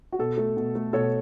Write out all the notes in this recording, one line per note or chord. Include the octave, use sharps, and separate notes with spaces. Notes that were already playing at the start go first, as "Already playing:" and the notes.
F#4
B2 A4
A3
B2
A3
B2 A4 C#5